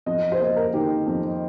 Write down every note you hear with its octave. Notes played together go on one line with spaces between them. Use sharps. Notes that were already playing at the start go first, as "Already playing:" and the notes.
F2 D#5
C5
A#3 D#5
A#4
D#3 G4
F2